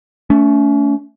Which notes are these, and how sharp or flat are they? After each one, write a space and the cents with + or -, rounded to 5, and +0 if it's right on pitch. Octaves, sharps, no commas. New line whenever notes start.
A3 +0 C#4 +40